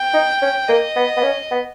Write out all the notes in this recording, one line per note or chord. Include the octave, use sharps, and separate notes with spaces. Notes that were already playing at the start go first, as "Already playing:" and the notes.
Already playing: G5
D#4
C#4
A#3 D#5
B3
B3
C#4
B3